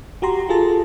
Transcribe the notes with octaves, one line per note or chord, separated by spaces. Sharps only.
F#4 G4 A#5 C6
F4 G#4 A4 A5